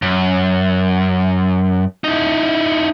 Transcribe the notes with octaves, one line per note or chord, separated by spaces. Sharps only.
F#2
D#4 E4